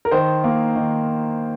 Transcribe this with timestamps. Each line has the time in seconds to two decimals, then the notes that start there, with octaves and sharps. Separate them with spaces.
0.05 A#4
0.11 D#3 C5
0.44 A#3
0.76 D#3